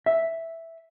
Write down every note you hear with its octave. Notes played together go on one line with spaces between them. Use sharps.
E5